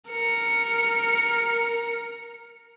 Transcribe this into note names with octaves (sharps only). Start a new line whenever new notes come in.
A#4 C#7